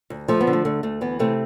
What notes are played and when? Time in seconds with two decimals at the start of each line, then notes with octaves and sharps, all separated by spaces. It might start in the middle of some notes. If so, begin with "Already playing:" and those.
0.10 D2
0.28 F3 A3
0.41 B3
0.47 D3
0.53 A3
0.65 D2 A3
0.83 D2 A3
1.01 E3 B3
1.19 C3 A3 C4